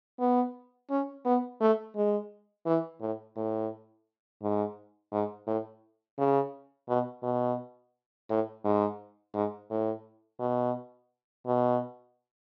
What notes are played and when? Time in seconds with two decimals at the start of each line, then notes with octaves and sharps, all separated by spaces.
0.20 B3
0.90 C#4
1.26 B3
1.61 A3
1.96 G#3
2.66 E3
3.01 A2
3.37 A2
4.42 G#2
5.12 G#2
5.47 A2
6.19 C#3
6.89 B2
7.23 B2
8.30 A2
8.64 G#2
9.34 G#2
9.70 A2
10.40 B2
11.46 B2